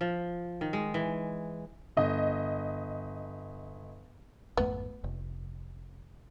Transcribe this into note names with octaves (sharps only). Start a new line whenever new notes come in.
F3
D#3
G#3
E3
G1 D#5
G#1 F2 A3 B3
F1